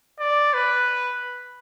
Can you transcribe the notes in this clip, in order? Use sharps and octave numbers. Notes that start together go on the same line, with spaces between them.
D5
B4